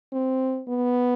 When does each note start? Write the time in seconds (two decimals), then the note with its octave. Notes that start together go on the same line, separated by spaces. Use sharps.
0.12 C4
0.68 B3